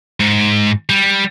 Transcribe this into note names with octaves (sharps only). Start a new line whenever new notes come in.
G#2
G3